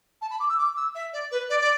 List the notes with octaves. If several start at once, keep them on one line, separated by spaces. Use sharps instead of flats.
A5
B5
D6
E6
D6
E6
E5
D5
B4
D5
D5